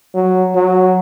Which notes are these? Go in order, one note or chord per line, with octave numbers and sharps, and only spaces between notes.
F#3
F#3